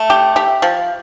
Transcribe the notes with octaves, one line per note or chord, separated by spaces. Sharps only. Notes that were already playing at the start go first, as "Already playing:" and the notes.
Already playing: A3
G4
G4
F3